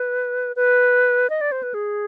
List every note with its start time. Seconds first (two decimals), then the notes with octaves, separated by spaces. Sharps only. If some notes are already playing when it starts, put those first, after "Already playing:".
Already playing: B4
0.56 B4
1.30 D#5
1.41 D5
1.52 C5
1.63 B4
1.74 G#4